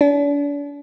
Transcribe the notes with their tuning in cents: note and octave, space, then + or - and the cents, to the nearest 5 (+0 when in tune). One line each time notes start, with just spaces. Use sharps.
D4 -40